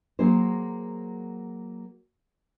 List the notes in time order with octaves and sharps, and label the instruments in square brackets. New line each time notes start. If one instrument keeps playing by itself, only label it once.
[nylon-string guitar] F#3 A#3 G#4 C5